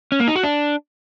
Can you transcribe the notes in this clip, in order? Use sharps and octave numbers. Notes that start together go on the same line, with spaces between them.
C#4
A#3
D#4
F#4
D4